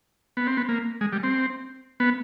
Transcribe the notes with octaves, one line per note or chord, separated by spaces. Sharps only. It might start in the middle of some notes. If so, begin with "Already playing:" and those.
B3
C4
B3
A#3
G#3
G3
C4
B3